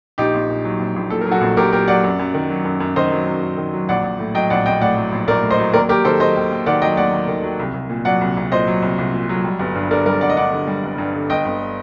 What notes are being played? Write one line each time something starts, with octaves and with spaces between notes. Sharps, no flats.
A#1 D#4 G4
A#1
A#2
F#3
A#1
A#1
A#2 A4
A#4
F#3
F#4 A4
A#1
A#1 G4 A#4
A#2 G4 A#4
F#3 D5 F#5
F#2
F#2
D#3
F#3
F#2
F#2
D#3 C5 D#5
F#3
F#2
F#2
D#3
F#3
A#1 D5 F#5
A#1
A2
F#3 D#5 G5
A#1 D5 F#5
A#1 D#5 G5
A2 D5 F#5
F#3
A#1
A#1 A#4 D5
A2
C5 D#5
F#3
D#2 A#4 D5
D#2 G4 A#4
D#3 A4 C5
F#3 C5 D#5
D#2
D#2
D#3 D5 F#5
F#3 D#5 G5
D#2 D5 F#5
D#2
D#3
F#3
C2
C2
A#2
F#3 D5 F#5
C2
C2
A#2 C5 D#5
F#3
C2
C2
A#2
F#3
G3
G1
G2
D3 A#4 D5
G3 A#4 D5
G1 D5 F#5
D#5
G2 D5 F#5
D3
G3
G1
G2
D3
G1 D#5 G5
G1